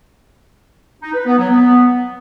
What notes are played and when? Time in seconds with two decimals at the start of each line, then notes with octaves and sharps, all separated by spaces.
1.02 D#4
1.14 B4
1.26 B3
1.38 F#3
1.49 B3